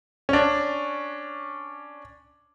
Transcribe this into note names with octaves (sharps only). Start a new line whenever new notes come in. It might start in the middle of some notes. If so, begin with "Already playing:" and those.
C#4 D4